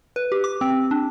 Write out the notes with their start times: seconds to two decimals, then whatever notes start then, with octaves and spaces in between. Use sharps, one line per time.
0.16 B4
0.32 G4
0.44 D6
0.61 C4
0.91 D4